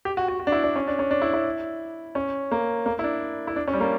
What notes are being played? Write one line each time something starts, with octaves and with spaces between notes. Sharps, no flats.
G4
F#4
F#4
F#4
D4
E4
D4
C#4
D4
C#4
D4
E4
E4
C#4
A#3
A#3
E4
D4
E4
D4
C#4
G3
A#3